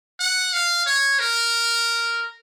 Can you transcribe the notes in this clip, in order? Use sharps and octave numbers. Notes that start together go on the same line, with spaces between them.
F#5
F5
C#5
A#4